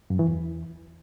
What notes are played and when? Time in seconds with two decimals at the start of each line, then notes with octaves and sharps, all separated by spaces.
0.10 F#2
0.19 E3
0.28 E2